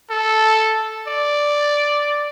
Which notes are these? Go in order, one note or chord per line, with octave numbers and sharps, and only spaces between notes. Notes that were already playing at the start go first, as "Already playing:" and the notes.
A4
D5